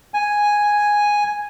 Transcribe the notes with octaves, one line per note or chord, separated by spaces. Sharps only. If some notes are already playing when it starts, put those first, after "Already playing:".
G#5